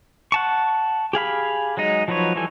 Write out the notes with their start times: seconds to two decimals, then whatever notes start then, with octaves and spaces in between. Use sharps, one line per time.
0.32 F#5 A5 C#6
1.13 G4 G#4 F5 B5
1.77 F#3 G#3 D#4 D#5
2.08 F3 F#3 D#4 B4 C#5
2.36 E3 F3 G3 A4 G#5